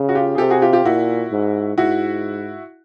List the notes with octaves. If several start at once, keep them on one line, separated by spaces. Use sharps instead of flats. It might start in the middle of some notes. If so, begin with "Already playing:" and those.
Already playing: C#3
F#4
F4 G4
G#4
C3 G4 A4
F#4 G#4
F4 G4
F4 G4
A#2 E4 F#4
G#2
G#2 E4 F#4